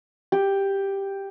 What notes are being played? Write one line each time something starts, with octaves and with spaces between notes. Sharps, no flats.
G4